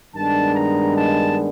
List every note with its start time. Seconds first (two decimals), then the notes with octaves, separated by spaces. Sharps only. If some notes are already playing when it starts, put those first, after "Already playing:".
0.15 G2 D#3 G#3 B3 D4 A5
0.55 A#5
0.96 A5